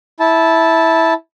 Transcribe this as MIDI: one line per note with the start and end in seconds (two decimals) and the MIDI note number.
0.20 1.14 64
0.20 1.14 81